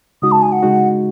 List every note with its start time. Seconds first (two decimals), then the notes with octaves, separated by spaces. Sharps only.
0.22 C#3 G#3 D#4 F#4 D#6
0.32 A5
0.42 G#5
0.52 F#5
0.63 C#3 G#3 D#4 F#4